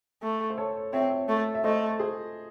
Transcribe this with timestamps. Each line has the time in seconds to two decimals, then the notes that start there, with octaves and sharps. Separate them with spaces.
0.22 A3
0.50 C5
0.57 A4 C#5
0.93 C4 C#5 E5
1.28 A3
1.55 E5
1.64 A3 C5 D#5
1.99 G#4 C5